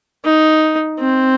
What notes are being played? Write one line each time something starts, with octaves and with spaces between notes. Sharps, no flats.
D#4
C4